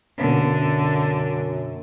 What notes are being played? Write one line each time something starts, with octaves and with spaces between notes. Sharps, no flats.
F#2 B2 D3 A#3 C#4